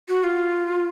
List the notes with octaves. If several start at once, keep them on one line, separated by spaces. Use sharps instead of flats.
F#4
F4